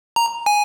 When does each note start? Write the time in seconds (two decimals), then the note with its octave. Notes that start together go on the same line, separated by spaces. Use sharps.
0.16 A#5
0.46 G#5